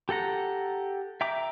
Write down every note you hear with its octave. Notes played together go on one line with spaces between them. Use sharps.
G4 A4 F#5 A#5
E5 G5 A#5 D6